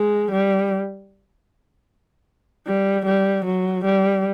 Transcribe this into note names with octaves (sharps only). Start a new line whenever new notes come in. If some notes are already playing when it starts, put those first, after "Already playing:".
Already playing: G#3
G3
G3
G3
F#3
G3